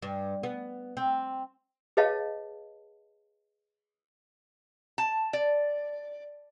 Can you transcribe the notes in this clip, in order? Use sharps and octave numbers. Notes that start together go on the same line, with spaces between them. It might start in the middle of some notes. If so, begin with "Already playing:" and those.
G2
B3
C4
G#4 B4 C#5 D#5 F5 A5
A5
D5